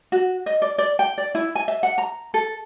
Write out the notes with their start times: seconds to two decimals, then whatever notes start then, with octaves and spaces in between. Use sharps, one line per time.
0.12 F#4
0.46 D#5
0.62 D5
0.78 D5
0.99 G5
1.18 D5
1.35 E4
1.55 G#5
1.68 E5
1.83 F#5
1.98 A#5
2.34 A4